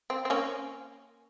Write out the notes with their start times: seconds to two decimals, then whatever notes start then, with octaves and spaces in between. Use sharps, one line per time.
0.10 C4
0.25 C4
0.30 A#3 C#4